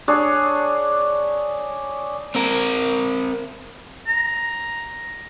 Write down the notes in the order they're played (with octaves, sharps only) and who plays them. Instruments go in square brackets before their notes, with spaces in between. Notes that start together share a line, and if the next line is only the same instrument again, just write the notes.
[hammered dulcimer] D4 G#4 C#5
[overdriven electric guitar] C4 A#4
[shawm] A#5